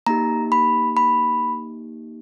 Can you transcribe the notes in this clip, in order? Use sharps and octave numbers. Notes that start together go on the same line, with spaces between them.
A#3 D#4 G4 A#5
B5
B5